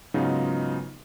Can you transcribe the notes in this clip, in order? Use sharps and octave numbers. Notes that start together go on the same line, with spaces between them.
G#2 C#3 F#3 B3 D#4 F4